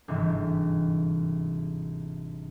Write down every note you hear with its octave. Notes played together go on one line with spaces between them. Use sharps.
G1 G#2 C3 E3